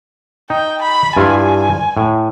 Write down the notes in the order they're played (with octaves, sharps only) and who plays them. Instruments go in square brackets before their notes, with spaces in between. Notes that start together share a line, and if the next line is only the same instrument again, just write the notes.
[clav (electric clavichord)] D#4 [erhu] G5
[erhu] B5
[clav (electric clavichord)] G2 E4 F4 [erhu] G#5
[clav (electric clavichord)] A2